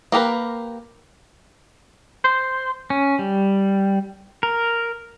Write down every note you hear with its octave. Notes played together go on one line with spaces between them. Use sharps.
A#3 G4 A#4 B4
C5
C#4
G3
A#4